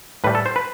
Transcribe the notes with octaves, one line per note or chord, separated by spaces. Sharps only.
A2 G3 B4
A4
C5
B4